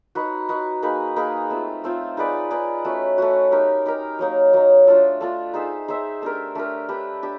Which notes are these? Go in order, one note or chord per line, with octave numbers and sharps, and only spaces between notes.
D#4 F#4 B4
D#4 F#4 B4
A#3 D#4 G#4 B4
A#3 D#4 G#4 B4
A3 C4 F4
A3 C4 F4
D#4 G#4 B4 D5
D#4 G#4 B4 D5
A3 C#4 F#4
A3 C#4 F#4
D#4 G4 A#4
D#4 G4 A#4
F#3 A#3 D#4
F#3 A#3 D#4
A3 D4 F4 A4
A3 D4 F4 A4
D#4 G#4 C5 E5
D#4 G#4 C5 E5
A3 D4 G4 A#4
A3 D4 G4 A#4
D4 G4 B4
D4 G4